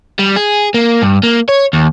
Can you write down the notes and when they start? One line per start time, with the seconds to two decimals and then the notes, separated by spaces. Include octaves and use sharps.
0.19 G3
0.36 G#4
0.74 A#3
1.02 G2
1.23 A#3
1.49 C#5
1.73 D#2